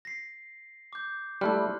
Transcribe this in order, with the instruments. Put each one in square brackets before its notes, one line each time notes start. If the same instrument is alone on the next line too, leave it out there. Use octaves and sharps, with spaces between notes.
[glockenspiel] A#6 C7
D6 G6
[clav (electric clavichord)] G3 A3 E4 [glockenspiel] C6 F6 F#6